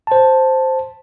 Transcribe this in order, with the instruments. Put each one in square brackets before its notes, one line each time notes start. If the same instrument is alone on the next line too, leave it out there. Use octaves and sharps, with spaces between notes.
[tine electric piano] C5 A5